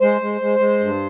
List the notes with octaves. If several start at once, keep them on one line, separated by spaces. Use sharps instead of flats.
G#3 C5
G#3
G#3
G#3
G2